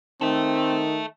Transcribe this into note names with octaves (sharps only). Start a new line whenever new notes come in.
D#3 C4 A4 E5